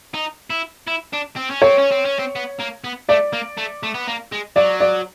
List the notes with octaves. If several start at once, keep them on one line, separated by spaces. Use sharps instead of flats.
D#4
E4
E4
D4
C4
C#4
C4 C#5
C#4
C4
C#4
C4
B3
A#3
B3
A3 D5
A#3
A3
A3
B3
A#3
G#3
F#3 D5
D5